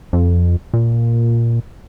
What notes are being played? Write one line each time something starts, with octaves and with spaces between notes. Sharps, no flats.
F2
A#2